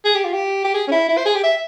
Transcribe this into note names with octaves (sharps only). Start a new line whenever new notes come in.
G#4
G4
F4
G4
G4
G#4
C#4
E4
E4
C5
G#4
G4
E5